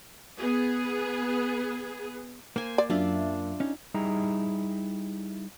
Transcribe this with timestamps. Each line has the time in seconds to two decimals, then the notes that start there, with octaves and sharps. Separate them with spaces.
0.38 B3 G#4
2.56 A#3 C5 G#5
2.78 D5
2.90 F#2 D4 F4 E5
3.60 C#4 D#4
3.94 G3 D#4 E4 G#4 A#5